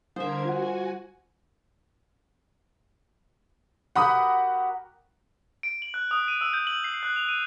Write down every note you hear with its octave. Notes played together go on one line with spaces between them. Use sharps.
D3 G3 A#4 C5 E5 G#6
F4 F#4 F#5 G#5
F#4 G4 A#4 F#5 B5 D#6
D7
F#7
F#6
D#6
D#7
E6
G6
F#7
C7
F#6
F7
D#7